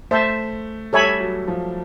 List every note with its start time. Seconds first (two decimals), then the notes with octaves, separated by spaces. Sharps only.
0.11 A3 C5 E5 A5
0.93 G3 A4 C#5 E5 G#5 B5
1.21 F#3
1.48 F3